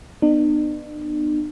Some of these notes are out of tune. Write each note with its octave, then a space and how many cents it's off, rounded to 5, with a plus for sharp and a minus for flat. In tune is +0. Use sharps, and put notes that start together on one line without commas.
B3 +0 D4 +45